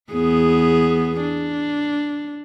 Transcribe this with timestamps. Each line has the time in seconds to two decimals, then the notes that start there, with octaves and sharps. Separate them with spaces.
0.13 E2 B3 G#4
1.21 D4